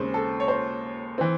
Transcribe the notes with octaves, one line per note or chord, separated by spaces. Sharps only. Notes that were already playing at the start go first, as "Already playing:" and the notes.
Already playing: D#2 C#3 G#3 C4 C5
A4
C#5
C5
E3 C4